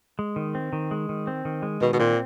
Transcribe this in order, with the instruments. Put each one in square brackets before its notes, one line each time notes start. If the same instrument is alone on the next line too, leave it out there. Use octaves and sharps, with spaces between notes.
[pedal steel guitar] G#3
D#3
C4
D#3
G#3
D#3
C4
D#3
G#3
[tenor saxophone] B2 [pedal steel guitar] D#3
[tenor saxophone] B2
[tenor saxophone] A#2 [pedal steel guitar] C4